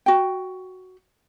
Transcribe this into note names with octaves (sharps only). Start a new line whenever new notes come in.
F#4 G5